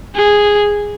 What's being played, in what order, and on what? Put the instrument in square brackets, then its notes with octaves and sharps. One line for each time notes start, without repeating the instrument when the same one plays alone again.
[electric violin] G#4